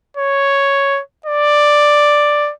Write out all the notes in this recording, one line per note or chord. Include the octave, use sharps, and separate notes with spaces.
C#5
D5